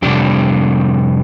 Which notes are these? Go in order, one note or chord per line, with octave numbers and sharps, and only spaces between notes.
F2 C3 G3 D4 G4